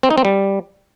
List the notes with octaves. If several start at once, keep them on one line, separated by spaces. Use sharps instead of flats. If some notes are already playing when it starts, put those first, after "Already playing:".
C4
D#4
C4
G3